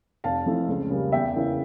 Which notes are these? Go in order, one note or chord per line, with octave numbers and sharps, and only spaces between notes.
F1 F5 A5
F2 E3 A3
C#2
C#3 G3 A#3
E2 E5 G5
C#3 E3 A#3